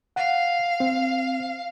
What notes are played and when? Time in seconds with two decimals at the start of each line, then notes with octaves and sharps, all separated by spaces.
0.16 F5 F#5
0.80 C4